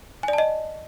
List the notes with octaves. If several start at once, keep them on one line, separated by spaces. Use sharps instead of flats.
G#5
D5
A5
D#5